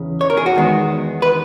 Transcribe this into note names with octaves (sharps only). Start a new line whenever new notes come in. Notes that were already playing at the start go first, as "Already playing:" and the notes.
Already playing: E2 C#3
C#5
A#4
G#4
F#4
E2 D#3 G#3 B3
B4